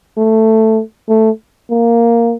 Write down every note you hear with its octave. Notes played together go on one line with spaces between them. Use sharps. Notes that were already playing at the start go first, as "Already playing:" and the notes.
A3
A3
A#3